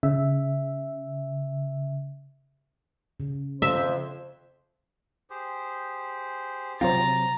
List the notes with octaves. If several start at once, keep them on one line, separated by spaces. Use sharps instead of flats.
C#3 E5
C#3
F2 C5 E5
G4 G#4 C5
C3 F#3 C4 F4 C5 A#5 A6